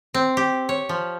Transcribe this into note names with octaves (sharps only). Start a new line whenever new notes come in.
C4
G4
C#5
F3